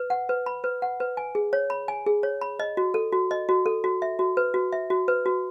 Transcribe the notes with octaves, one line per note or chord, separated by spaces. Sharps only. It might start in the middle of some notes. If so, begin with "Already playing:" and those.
Already playing: B4
F#5
B4
B5
B4
F#5
B4
G#5
G#4
C#5
B5
G#5
G#4
C#5
B5
D#5
F#4
A4
F#4
D#5
F#4
A4
F#4
E5
F#4
B4
F#4
E5
F#4
B4
F#4